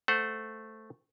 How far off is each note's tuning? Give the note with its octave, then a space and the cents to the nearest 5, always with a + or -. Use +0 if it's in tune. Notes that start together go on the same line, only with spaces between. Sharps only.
A3 +0 C5 +0 F#5 +0